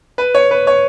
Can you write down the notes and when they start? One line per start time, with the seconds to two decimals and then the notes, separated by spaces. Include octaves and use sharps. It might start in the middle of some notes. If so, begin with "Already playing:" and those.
0.18 B4
0.35 C#5
0.51 B4
0.67 C#5